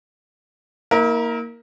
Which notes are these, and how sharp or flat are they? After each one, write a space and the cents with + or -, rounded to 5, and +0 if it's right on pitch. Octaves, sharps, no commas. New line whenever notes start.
A#3 +0 E4 -40 A#4 +0